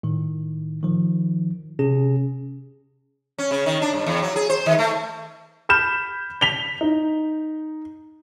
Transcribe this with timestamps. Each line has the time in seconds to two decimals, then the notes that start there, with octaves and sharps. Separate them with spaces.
0.03 A2 D#3
0.83 D#3 F3
1.79 C3 C#4 G#4
3.38 C#4
3.51 C#3
3.66 D#3
3.82 D4
3.93 G2
4.06 E2
4.22 F#3
4.36 G#4
4.50 C5
4.66 D#3
4.79 A3
5.69 B5 F6 G6 E7
6.41 B6 F7 G7
6.81 D#4